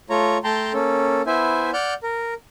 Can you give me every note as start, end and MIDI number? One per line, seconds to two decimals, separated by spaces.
0.10 0.38 57
0.10 0.38 65
0.10 0.38 73
0.10 0.38 82
0.44 0.73 57
0.44 0.73 79
0.44 0.73 81
0.44 0.73 82
0.44 0.73 84
0.73 1.22 58
0.73 1.22 61
0.73 1.22 69
1.27 1.71 59
1.27 1.71 64
1.27 1.71 72
1.27 1.71 76
1.27 1.71 80
1.73 1.94 74
1.73 1.94 78
1.73 1.94 89
1.73 1.94 91
2.03 2.34 70